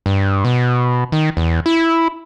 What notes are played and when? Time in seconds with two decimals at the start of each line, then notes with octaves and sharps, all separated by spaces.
0.06 G2
0.45 B2
1.12 D#3
1.37 E2
1.66 E4